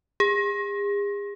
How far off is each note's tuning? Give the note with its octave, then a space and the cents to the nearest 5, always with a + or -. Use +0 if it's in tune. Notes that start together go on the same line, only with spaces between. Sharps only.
G#4 -40